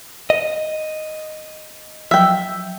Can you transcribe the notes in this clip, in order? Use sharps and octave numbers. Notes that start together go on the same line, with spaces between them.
D#5
F3 F#3 E5 G5